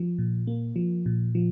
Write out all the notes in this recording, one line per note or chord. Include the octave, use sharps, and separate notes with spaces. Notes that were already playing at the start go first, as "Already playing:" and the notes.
Already playing: F3
A#2
A#3
F3
A#2
F3